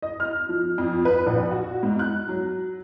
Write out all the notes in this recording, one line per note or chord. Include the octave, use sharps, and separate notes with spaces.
D#5
F6
F3
F2
B4
A#1
F#4
G#2
F#6
F#3